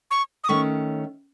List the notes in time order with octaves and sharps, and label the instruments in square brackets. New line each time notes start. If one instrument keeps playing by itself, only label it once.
[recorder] C#6
D#6
[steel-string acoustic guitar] D#3 A3 C#4 [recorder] C#6